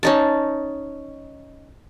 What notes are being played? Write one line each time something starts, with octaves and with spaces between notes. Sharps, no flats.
C#4 D#4 A5